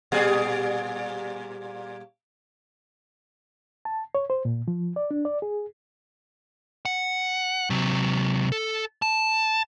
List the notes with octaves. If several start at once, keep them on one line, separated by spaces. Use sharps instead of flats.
A#2 G3 G#4
A5
C#5
C5
A#2
F3
D5
D4
D5
G#4
F#5
C3 F#3
A4
A5